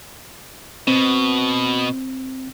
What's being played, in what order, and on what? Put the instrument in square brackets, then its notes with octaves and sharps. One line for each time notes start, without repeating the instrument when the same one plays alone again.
[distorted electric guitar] B2 [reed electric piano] C4